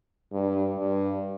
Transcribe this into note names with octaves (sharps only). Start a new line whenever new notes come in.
G2
G2